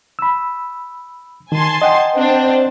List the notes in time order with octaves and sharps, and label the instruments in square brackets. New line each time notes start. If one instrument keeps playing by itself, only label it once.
[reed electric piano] B5 E6
[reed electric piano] D#3 [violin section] G#5 A5 C6
[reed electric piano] D#5 F#5 G5
[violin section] C4 D4 C5